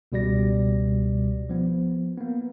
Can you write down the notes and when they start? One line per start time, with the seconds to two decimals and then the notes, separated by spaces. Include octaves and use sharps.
0.12 C#2 B2 G3 D5 A#6
1.49 F3 B3
2.17 A#3 B3